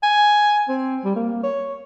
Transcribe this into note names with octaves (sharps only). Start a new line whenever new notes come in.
G#5
C4
G3
A#3
C#5